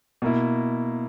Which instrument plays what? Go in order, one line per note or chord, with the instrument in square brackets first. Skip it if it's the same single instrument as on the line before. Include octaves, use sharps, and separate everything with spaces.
[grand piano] B2 A#3 E4